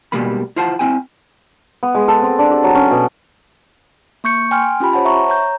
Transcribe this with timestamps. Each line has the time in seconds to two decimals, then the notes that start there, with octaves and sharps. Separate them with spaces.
0.12 B2 D#3 G3 G#3 A#3 B5
0.56 E4 F4 C5 F#5 A5
0.79 C4 E4 G5 G#5
1.83 B3
1.95 G#3
2.08 A4
2.22 C4
2.39 D4
2.51 G4
2.64 F#3
2.75 C#4
2.91 B2
4.24 A#3 C#6 G6 C#7
4.51 G5 G#5 C6 F6
4.80 C#4 F4 G4 B5
4.93 C5 C#5 F#5 A5
5.05 E5 A#5 C#6
5.29 C#5 A#5 G6